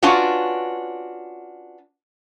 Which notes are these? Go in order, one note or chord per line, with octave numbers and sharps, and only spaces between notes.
C#4 D4 F4 F#4 B4 C#5